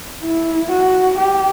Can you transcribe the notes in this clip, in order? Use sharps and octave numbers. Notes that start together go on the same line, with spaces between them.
E4
F#4
G4